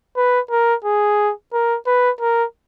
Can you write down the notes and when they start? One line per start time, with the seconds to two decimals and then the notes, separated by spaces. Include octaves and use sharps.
0.16 B4
0.51 A#4
0.84 G#4
1.53 A#4
1.86 B4
2.21 A#4